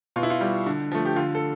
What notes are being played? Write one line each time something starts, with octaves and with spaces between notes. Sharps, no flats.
B2 F4
E4
F4
G3
D3
F3 A3
G4
D3 F4
A4